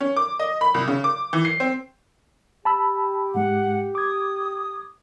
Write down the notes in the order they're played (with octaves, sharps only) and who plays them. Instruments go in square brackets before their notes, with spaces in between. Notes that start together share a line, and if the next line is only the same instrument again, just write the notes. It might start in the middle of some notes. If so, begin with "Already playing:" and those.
[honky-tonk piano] C#4
D6
D#5
B5
C2
C#3
D6
E3
C7
C4
[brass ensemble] G4 [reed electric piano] A5 B5 E6
[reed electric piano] G#2 G#3 [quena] F#5
[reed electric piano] D6 G#6 [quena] D#6